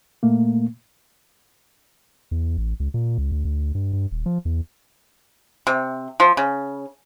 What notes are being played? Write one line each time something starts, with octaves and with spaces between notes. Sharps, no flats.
A#2 A3 A#3
E2
A1
C#2
A#2
C#2
D2
D2
G2
G2
D#1
F3
E2
C3
F3
C#3